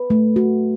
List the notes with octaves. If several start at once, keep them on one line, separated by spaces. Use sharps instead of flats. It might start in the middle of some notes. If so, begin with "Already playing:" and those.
Already playing: B4
A3
F#4